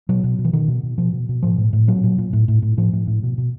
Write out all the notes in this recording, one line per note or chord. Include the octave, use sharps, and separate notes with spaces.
B2 F#3
B2
B2
E3
B2 D#3
B2
B2
B2 F3
B2
B2
A2 F3
A2
A2
A#2 F#3
A#2
A#2
A2
A2
A2
A2 F3
A2
A2
B2
B2